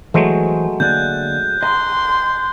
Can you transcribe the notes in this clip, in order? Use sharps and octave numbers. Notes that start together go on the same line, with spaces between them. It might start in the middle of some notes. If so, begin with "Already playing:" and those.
E3 F#3 G#3 A3 C5 G#5
D3 A#3 D5 F#6 G6
D#5 A#5 C6